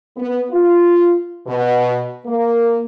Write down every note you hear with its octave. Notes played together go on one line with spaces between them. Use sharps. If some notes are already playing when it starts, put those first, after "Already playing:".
B3
F4
B2
A#3